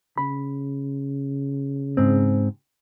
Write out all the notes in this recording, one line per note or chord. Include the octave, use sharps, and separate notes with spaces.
C#3 B5
G#2 C4